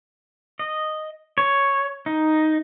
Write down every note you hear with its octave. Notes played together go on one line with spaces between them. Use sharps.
D#5
C#5
D#4